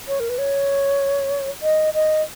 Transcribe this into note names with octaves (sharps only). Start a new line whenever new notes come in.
C#5
A#4
B4
C#5
D#5
D#5